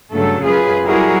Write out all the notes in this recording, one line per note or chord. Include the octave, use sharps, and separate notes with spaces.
G2 C#3 F#3 A3 A4
F#2 F4 G#4 B4
F#3 G3 E4 F#4 G#4 A#4